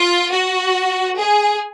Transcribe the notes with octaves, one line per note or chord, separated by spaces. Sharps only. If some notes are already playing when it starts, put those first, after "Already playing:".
Already playing: F4
F#4
G#4